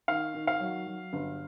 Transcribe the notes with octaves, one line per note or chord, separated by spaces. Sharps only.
D#3 F5
D#3
F5
F#3
F#3
G1